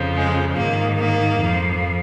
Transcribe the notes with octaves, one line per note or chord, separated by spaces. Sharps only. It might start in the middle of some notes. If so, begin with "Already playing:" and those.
Already playing: F2 C#3 F3
G#3
G#2 D#3 A#3
A#3
F2 F3